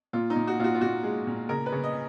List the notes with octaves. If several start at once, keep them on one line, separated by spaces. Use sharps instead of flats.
A#2 F4
D#4
A#2
F#4
A#2 F4 F#4
F4
A#2 F#4
G#3
A#2
C#3 A#4
B4
C#3
D#5